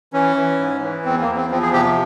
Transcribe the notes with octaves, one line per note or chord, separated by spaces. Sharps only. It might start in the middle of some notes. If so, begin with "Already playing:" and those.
E3 C#4
E3
G#2
E3
E2 C4
A#3
E2
C4
F3 C4
G#4
C3 G4